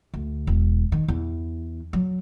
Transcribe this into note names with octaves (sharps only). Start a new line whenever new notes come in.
D2
E1
D#3
E2
F#3